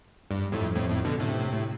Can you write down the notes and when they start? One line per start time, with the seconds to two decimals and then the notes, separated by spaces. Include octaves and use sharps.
0.31 G2
0.52 F2 A2
0.75 F2 A2
0.89 F2 A2
1.05 B2 D3
1.20 A2 C3
1.53 A2